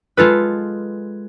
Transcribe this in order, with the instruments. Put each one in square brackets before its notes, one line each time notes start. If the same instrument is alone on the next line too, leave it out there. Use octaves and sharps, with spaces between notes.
[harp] G#3 F4 A4 B4